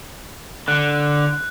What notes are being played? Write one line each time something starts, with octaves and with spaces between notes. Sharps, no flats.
D3 F#6